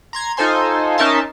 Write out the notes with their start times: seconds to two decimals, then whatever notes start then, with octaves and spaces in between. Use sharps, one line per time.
0.13 A#5 C6 G#6
0.37 D#4 F4 A4 C5 G#5 C6
0.98 C#4 D#4 A#4 E5 A5 C6